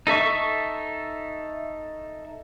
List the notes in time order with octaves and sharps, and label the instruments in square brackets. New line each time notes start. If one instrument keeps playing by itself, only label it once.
[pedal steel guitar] D#4 A4 E5 C#6